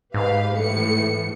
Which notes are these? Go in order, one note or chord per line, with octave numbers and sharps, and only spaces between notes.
G#2 G4 B4 F5
A2 E3 C#7